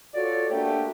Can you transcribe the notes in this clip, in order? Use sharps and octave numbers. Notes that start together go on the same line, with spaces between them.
F4 F#4 A4 C#5 D5
A3 A#3 D4 F#4 G4